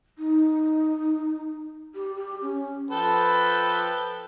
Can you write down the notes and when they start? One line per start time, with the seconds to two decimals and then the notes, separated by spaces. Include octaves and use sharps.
0.18 D#4
1.95 G4
2.17 G4
2.42 C#4
2.91 F3 A4 B4 G5